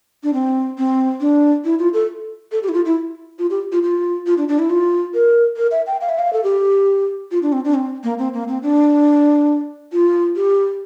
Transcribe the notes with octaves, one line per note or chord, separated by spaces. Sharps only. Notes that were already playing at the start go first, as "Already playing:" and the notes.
D4
C4
C4
D4
E4
F4
A4
A4
G4
E4
F4
E4
F4
G4
F4
F4
F4
D4
D4
E4
F4
A#4
A#4
E5
G5
F5
E5
F5
A4
G4
F4
D4
C4
D4
C4
A#3
C4
A#3
C4
D4
F4
G4